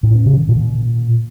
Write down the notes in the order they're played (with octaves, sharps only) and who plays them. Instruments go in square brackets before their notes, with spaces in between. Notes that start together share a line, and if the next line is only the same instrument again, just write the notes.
[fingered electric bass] A2
C#4
C#3
D#3
A#2